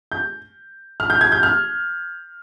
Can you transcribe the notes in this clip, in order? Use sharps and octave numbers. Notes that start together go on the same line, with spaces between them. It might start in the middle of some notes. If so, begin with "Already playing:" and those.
G6
F6
G6
G#6
G6
F6